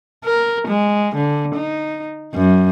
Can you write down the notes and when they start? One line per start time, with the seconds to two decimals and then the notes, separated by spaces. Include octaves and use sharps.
0.24 A#4
0.67 G#3
1.15 D3
1.54 D#4
2.34 F#2